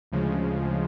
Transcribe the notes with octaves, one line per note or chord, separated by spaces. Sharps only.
D2 C#3 F3 G#3